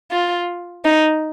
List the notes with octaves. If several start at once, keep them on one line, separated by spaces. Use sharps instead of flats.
F4
D#4